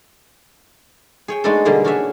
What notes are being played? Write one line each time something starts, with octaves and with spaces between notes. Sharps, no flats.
G#4 C#5 G5
G#3 A3 B3 D4 D#4 A4
B2 D3 G3 A#3 E4 G#4
C#4 D4 F#4 G#4 C#5 E5